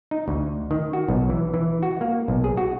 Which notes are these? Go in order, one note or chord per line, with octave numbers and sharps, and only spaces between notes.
D#4
D2
D#3
F#4
B1
E3
E3
F#4
A#3
B1
G#4
F#4